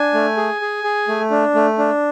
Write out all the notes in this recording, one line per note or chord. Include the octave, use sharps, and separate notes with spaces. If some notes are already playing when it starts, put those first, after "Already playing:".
Already playing: D4 G#5
A3
G#4
G#4
G#4
A3
D4
A3
D4